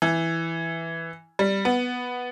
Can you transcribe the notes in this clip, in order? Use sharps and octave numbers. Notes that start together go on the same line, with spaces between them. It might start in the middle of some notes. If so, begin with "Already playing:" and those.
E3
G3
B3